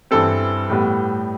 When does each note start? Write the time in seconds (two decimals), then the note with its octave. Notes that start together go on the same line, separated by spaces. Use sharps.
0.11 G2 E3 G3 C4 A4
0.70 A2 G3 B3